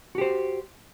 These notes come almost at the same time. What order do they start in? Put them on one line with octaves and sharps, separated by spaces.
F#4 G4 C5